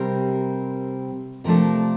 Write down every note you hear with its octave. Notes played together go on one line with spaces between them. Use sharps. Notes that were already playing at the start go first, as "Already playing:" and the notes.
Already playing: C3 G3 C4 A#4
C3 F3 A3 D4 A#4